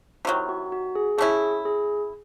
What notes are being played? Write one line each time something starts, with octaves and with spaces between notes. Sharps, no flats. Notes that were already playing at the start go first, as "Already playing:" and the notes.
C3 D#3 F#3 E4
F#4
F#4
G#4
A3 C#4 E4 G#4
G#4